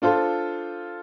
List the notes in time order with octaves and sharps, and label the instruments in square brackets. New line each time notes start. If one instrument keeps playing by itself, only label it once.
[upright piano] D4 F4 A4 C5